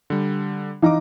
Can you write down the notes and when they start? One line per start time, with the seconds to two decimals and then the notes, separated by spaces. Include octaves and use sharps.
0.10 D3 G3
0.82 E3 D#4 F5 A#5 D6